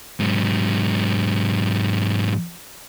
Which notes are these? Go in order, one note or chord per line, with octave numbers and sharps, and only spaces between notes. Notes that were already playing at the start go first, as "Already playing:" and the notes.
G#2 F#3